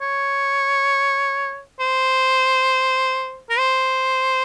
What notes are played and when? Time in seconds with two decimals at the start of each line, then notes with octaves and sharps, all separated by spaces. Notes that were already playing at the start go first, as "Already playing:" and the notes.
0.01 C#5
1.80 C5
3.50 A#4
3.59 C5